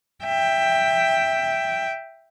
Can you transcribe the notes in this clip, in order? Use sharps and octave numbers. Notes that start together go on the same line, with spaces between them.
E5 G5